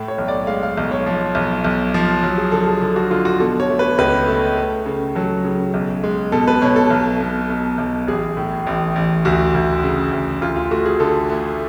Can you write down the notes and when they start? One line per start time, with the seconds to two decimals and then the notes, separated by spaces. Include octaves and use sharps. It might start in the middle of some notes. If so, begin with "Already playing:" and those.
Already playing: A2
0.08 C#5
0.18 B1
0.28 D5
0.47 G#3 F5
0.63 F5
0.77 B1
0.91 C#5
1.06 F3
1.35 B1
1.64 B1
1.94 F3
2.23 F#3
2.38 G#4
2.52 D3 A4
2.67 G#4
2.81 D3 A4
2.96 F#4
3.11 D3 F4
3.25 F#4
3.40 B2 A4
3.60 C#5
3.69 A3
3.79 B4
3.98 C#2 B4
4.28 A3
4.57 A3
4.86 C#3
5.15 F#3 A4
5.45 C#3
5.74 B1
6.04 G#3
6.32 B2 A4
6.48 B4
6.62 B2 C#5
6.76 A4
6.90 B1
7.20 B2
7.50 B2
7.78 B1
8.07 A1 G#4
8.37 A2
8.67 A1
8.96 A1
9.25 D2 F#4
9.54 D2
9.83 C#3
10.12 D2
10.41 D2 F4
10.56 F4
10.71 A3 F#4
10.85 G#4
11.00 D3 A4
11.30 A3